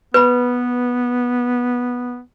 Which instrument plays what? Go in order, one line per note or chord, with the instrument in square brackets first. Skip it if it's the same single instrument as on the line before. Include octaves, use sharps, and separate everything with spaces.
[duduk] B3 [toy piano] B4 B5